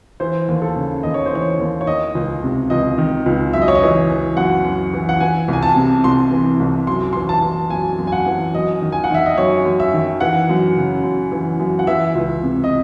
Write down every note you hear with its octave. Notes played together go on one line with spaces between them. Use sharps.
E3 C5
D#2
A4
C#3
D#2 D#5
C#5
C5
E3 C#5
D#2
C#5
D#3 D#5
C#2
C3
C#2 D#5
D#3
C#2
F#2 E5
D#5
C#5
D#5
E3
E3
F#2 F#5
F#2
E3
F#5
E3 G#5
C2 G#5
A5
C3
C2 C6
E3
C2
F#2 C6
E3 C6
A5
E3
F#2 G#5
F#2
G#5
F#5
E3
F#2 D#5
D#3
G#5
F#5
D#3 E5
D#5
F#2 C#5
F#2
E5
D#3
E3 F#5
F#2
C#3
F#2
E3
F#2
F#5
E3 E5
C#2
C3
D#5